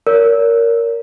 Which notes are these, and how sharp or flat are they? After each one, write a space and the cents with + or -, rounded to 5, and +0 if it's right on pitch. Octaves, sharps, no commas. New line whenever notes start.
A#4 +0 C#5 +45